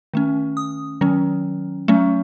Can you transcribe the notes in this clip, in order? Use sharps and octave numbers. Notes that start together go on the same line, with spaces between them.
D#3 A3 C#4
D#6
D#3 F#3 C#4
F#3 A3 C#4